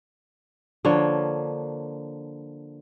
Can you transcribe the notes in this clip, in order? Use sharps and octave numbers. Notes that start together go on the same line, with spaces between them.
D3 F3 A#3 C#5